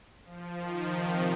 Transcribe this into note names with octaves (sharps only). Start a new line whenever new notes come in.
F3
D#3
C3